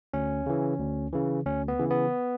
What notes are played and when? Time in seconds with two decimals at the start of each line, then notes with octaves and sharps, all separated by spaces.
0.13 D2 C#4
0.46 C#3 E3
0.80 D2
1.13 C#3 E3
1.46 D2 C#4
1.68 B3
1.79 C#3 E3
1.90 B3